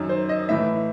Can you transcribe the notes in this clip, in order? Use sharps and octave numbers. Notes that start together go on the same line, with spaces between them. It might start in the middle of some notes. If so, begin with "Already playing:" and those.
Already playing: F#2 D#3
C5
D#5
A2 E3 E5